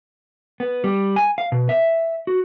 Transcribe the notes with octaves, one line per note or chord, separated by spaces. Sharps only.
B3
G3
G#5
F5
B2
E5
F#4